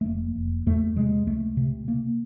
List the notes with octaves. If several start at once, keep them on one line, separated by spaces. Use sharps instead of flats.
A3
F1 A#3
F1
E2 A3
C3 G#3
C#2 A3
C3
C3 A#3